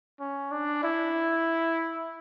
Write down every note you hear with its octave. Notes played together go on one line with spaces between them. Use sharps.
C#4
D4
E4